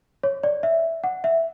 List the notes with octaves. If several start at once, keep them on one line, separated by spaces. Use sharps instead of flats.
C#5
D5
E5
F#5
E5